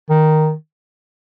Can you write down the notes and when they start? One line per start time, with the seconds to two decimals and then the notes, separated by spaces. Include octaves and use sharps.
0.10 D#3